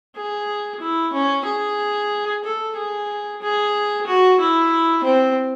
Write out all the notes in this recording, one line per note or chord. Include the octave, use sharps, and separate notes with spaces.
G#4
E4
C#4
G#4
A4
G#4
G#4
F#4
E4
C4